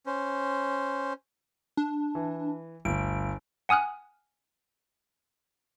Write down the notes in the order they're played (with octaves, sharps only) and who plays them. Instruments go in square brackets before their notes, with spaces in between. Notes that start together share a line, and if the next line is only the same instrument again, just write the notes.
[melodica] C#4 C5
[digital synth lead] D4
[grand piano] E3
[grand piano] G1 D2 [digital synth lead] D7
[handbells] F#5 G#5 D#6 F6 F#6